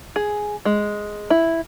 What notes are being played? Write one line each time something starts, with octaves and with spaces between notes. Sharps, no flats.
G#4
G#3
E4